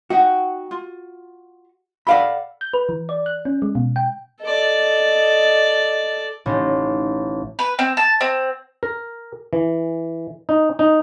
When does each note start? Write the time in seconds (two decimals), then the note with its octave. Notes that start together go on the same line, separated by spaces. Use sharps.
0.10 D#4 F#4 F#5 G5
0.71 F4
2.07 A4 D5 F5 F#5 B5
2.61 G6
2.74 B4
2.89 E3
3.09 D5
3.26 F#6
3.45 C#4
3.62 G#3
3.75 B2
3.96 G5
4.42 A4 D5 D#5
6.46 A1 A3 D#4
7.59 B4
7.79 C4
7.97 A5
8.21 C4
8.83 A#4
9.53 E3
10.49 D#4
10.79 D#4